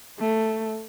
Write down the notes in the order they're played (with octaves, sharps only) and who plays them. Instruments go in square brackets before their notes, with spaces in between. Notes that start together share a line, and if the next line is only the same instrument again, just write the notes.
[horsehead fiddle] A3